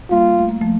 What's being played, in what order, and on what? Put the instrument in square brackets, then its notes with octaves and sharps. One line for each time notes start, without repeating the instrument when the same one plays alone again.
[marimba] G3 A#3 [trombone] F4
[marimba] A3
A#3
F3 A3